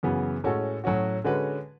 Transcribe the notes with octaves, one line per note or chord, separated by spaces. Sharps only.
F#2 C#3 E3 B3 F#4
A2 G#3 C#4 F#4 A4
A2 F#3 C#4 F#4
D3 G#3 C#4 F#4 B4